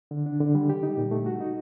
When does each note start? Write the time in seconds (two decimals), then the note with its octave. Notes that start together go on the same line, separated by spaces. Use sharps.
0.11 D3
0.26 D4
0.40 D3
0.55 G3
0.69 G4
0.83 D#4
0.97 A#2
1.11 A3
1.26 F#4
1.40 D#4